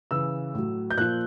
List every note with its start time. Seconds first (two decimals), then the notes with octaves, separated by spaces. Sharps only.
0.11 C#3 E3 E6
0.54 A2 F#3
0.91 G6
0.97 A#2 F3 F#6